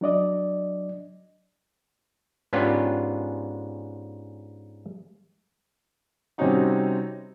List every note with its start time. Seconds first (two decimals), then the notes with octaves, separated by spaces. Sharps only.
0.01 F#3 D4 D5 D#5
2.53 G#2 B3 C#4 D4 F4 G4
6.38 C3 G3 C4 C#4 D#4 F#4